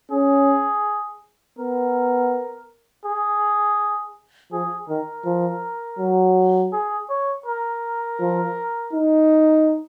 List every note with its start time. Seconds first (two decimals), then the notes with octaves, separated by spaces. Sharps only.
0.11 C#4 G#4
1.58 B3 A#4
3.05 G#4
4.52 F3 G#4
4.89 D#3 A#4
5.25 F3
5.99 F#3
6.72 G#4
7.10 C#5
7.46 A#4
8.20 F3
8.93 D#4